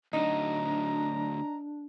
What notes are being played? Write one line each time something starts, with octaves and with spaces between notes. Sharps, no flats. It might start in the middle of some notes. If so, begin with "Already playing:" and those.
D2 F#3 D4 D#4 A#5